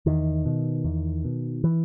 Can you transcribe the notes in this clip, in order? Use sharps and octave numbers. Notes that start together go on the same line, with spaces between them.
E2 D#3
B2
E2
B2
E3